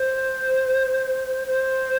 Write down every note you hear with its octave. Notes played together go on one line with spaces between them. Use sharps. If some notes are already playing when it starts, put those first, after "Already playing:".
Already playing: C5
C5